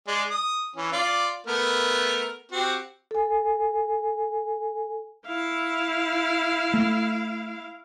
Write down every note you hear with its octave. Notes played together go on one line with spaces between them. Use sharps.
G#3 D5
D#6
E3 C#4
F4 D5
A3 B3 A#4
C4 F#4 G4
A4 G#5
E4 F5
A3